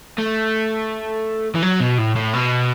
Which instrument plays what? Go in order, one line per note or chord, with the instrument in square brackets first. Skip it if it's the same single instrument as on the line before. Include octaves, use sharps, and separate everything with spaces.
[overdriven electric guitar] A3
E3
F#3
B2
A2
A2
B2